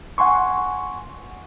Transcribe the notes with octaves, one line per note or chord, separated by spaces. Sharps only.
F#5 G#5 C6 C#6